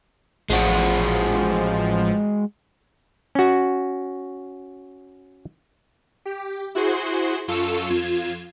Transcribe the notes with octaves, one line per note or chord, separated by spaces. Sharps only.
A1 F3 G#3 F#4
C#4 F#4
G4
E4 F#4 G#4 C5 C6
F#2 F4 A4 C#6 E6
F2 F4 G#6 E7